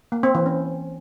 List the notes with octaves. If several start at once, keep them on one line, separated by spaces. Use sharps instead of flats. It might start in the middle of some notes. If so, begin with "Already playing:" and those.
A#3
C4
E3
C#4